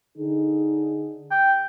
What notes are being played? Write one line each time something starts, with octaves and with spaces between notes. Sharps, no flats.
D3 D#4 G#4
G5